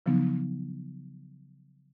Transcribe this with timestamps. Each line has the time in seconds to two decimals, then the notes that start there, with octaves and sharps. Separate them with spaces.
0.06 C#3 F3 F#3 B3 D#4